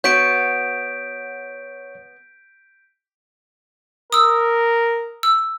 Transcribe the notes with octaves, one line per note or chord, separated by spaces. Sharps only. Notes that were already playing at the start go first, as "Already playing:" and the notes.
B3 F#4 C#5 G6 B6 D7
A#4 D#6 E6
E6